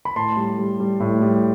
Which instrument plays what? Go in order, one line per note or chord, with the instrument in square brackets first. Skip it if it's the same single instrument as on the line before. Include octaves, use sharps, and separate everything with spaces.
[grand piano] B5
A2 A5 C6
G3
G3
G3
A2
G3